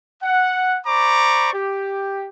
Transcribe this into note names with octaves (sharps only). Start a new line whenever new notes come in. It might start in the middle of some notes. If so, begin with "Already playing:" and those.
F#5
C5 D5 A#5 B5 C#6 D6
G4